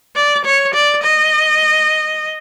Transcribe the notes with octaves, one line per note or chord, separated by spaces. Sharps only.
D5
C#5
D5
D#5